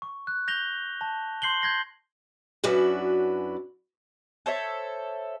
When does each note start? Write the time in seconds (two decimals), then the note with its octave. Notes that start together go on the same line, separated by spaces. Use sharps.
0.02 C#6
0.27 F#6
0.48 G6 A#6 F7 G7
1.01 A5
1.42 C6 G6 C7 F#7 G7
1.62 G6 G#6 A#6 C7
2.64 F#2 C#4 D4 E4 F#4 B4
4.46 A4 C5 C#5 E5